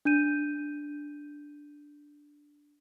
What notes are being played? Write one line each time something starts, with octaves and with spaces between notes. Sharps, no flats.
D4 G6 D#7